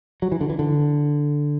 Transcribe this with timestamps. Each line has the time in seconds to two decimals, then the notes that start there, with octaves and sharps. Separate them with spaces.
0.22 F#3
0.32 E3
0.41 D3
0.50 E3
0.59 D3